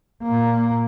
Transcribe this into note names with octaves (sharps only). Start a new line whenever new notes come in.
A#2 A#3